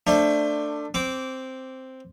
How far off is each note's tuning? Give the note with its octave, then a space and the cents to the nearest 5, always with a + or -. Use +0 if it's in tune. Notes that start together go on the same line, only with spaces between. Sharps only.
A3 +25 D4 +10 C5 +25
C4 +0 D6 -20